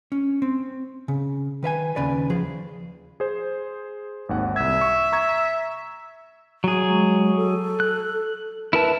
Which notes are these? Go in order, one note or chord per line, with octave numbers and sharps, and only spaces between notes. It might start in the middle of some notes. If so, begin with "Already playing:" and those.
C#4
C4
C#3
D#3 B4 E5 G#5
D#2 C#3 B4 D5
F3 G#4
G#4 C5
G#1 D#2 F#5
C2 E5 G#6
C#6
A#5 C#6 G#6
F#3 G#4
G#3
A4
F#6
E4 A#4 B4 A5